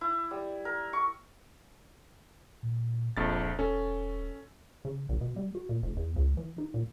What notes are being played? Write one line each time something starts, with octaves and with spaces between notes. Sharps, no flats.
E4
G3
A#4
C#6
A#2
E1 A#1 F2 A6
E1 C#4 A4
C#3
A#1
B2
G3
F#4
A#2
F1
E2
C#2
E3
D#4
A#2